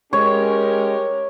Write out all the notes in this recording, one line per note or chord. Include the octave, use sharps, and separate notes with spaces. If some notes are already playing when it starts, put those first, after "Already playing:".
G#3 C#4 G4 A#4 C#5